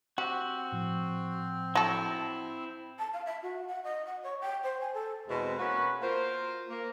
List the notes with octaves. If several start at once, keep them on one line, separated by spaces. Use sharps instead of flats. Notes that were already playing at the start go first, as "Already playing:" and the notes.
C4 F#4 G4
A2 F3
F#3 E4 A4
A5
F5
E5
F#4
F#5
D#5
F#5
C#5
G5
C5
G#5
A4
E2 B2 G#3 C4
A#3 B3 C#4 F#4 B4
A#3 F4 A#4 C5
A#3